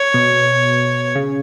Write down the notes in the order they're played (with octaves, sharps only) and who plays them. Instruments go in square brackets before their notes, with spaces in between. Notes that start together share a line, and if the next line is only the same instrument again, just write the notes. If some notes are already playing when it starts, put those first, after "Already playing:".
Already playing: [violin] C#5
[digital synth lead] B2
C#3